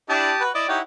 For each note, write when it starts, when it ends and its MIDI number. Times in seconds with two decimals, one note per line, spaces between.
0.09 0.32 62
0.09 0.32 64
0.09 0.43 67
0.09 0.43 81
0.09 0.43 87
0.40 0.50 66
0.40 0.50 71
0.40 0.50 78
0.55 0.65 64
0.55 0.68 74
0.55 0.65 75
0.55 0.68 86
0.69 0.79 63
0.69 0.82 64
0.69 0.79 67
0.69 0.79 73
0.69 0.82 78